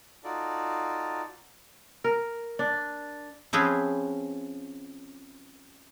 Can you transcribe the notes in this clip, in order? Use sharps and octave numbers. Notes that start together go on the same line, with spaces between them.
D#4 F4 F#4 A4 D5
A#4
D4
F3 C4 C#4 G#4 B4